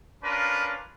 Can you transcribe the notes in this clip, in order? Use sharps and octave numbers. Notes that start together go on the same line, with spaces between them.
C#4 D4 F4 A#4 B4